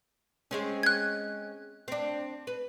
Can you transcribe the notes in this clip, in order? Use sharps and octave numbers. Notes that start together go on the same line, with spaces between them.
G#3 C4 C#4
F#6 G#6
C4 D4
B4